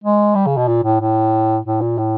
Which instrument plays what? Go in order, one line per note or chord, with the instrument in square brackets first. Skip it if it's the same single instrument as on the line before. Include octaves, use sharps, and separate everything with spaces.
[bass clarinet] G#3
G3
C#3
B2
A#2
A2
A2
A2
A#2
A2